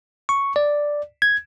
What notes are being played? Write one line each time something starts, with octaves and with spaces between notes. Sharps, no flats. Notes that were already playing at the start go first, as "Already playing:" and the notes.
C#6
D5
G#6